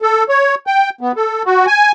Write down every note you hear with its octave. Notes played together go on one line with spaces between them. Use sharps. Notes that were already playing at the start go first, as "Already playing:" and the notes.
A4
C#5
G5
B3
A4
F#4
G#5